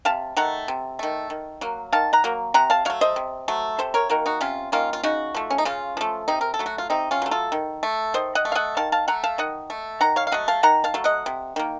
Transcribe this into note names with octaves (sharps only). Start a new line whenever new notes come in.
C3 F5 A5
D#3 A3 F#5 A#5
C3
D#3 A3
D#3
F#3 A#3
D#3 F5 A5
F#5 A#5
F#3 A#3
C3 F#5 A#5
F5 A5
F#3 A3 C#5 F5
C5 D#5
C3
F#3 A3
C3 A4 C5
A#4 C#5
D#3 A#3 F#4 A#4
D#4 F#4
C3 C#4 F4
D#3 A#3 C#4 F4
F4
C#3 D#4 F#4
F3 A3
C#4
D#4
C#3 C#4 F4
F3 A3
C3 C4 D#4
A#4
A4
F#3 A3
F#4
F4
C3 C4 D#4
C#4 F4
F#3 A3
F4 A4
D#3
A3
D#3 C5 D#5
D#5 F#5
A3
F5
D#5 F#5
D#3 F5 A5
F5 A5
A3 F#5 A#5
F5 A5
D#3 D#5 F#5
A3
D#3 F#5 A#5
C#5 F5
F5
F#3 A3 D#5 F#5
F5 A5
D#3 F#5 A#5
F5 A5
F#3 A3
D#5 F#5
C3
D#3 A#3